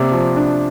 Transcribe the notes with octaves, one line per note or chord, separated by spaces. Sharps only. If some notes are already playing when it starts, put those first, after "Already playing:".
Already playing: C3 A#3 D5
F3
D4